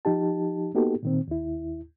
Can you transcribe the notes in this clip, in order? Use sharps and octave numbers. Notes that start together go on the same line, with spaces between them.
F3 D#4 G4 A5
A#3 B3 D#4 F#4 G4 A4
A#2 D#3 C4
D#2 E4